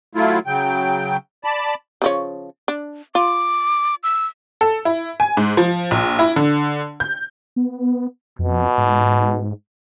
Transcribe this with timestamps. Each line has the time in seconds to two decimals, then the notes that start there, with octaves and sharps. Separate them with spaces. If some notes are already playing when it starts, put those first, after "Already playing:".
0.15 F#3 A3 E4 F4
0.46 C#3 F#3 G5
1.44 D5 A5 B5
2.02 C#3 F3 C#5
2.68 D4
3.15 F4 D6
4.03 E6
4.61 A4
4.85 E4
5.20 G#5
5.37 G#2
5.57 F3
5.91 A#1
6.19 E4
6.36 D3
7.00 G6
7.56 B3
8.39 F2 B2
8.78 G#2